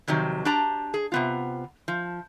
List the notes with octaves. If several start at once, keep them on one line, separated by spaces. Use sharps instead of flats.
F2 C3 D#3 F#3
D4 G4 A5 A#5
G#4
C3 B3 F4
F3